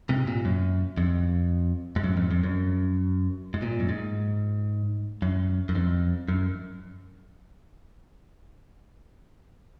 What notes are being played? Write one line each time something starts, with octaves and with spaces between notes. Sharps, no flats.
G#2 C3
A#2
F#2
F2
G#2
F#2
F2
F2
F#2
G#2
A#2
F#2
G#2
F#2
F#2
F2
F#2